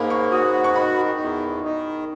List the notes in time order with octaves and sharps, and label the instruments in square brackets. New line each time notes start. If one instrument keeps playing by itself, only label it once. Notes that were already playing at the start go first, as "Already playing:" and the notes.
Already playing: [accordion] G#2 A#3 [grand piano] A#5 B5
[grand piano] C#6
[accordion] F#4 [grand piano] D#6
[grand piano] C#6
[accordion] D#3 [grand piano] B5
[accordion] E2
D#3